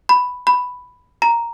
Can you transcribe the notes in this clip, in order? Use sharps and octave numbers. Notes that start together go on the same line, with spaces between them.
B5
B5
A#5